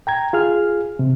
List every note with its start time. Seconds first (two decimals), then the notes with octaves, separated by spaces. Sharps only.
0.07 G5 A#5 G#6
0.33 F4 G#4 F6
0.99 C3